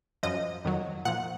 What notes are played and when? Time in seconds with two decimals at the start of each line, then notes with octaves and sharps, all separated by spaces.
0.23 F#2 F3 D#5
0.65 F2 D#3 F#3
1.05 A#2 F3 F#5